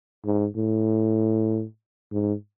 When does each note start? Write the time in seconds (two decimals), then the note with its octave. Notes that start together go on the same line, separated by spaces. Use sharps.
0.25 G#2
0.56 A2
2.12 G#2